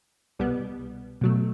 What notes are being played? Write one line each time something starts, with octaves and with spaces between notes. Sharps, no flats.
C2 B2 G3 B3
B2 F#3 A3